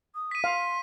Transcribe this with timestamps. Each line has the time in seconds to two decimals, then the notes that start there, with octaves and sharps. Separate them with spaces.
0.15 D#6
0.31 B6 D#7
0.44 F5 C6